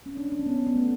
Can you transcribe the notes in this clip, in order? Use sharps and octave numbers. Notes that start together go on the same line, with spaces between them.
C#4
D4
D4
C#4
B3
B3
A3